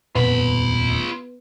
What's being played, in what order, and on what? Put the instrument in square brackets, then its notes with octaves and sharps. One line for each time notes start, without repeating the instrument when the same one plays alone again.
[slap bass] D#1 F2 [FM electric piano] B3 [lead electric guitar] F4 B5